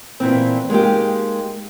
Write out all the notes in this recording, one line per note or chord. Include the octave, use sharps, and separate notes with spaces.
A#2 E3 C4
G#3 A#3 D#4 G4